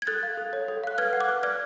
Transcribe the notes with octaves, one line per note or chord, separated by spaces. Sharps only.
G#6
A4 F#6 A6
F5
A4
C#5
A4
F5 F#6
B4 F6 G#6
F#5
D6 F#6
B4
D5 F6 G#6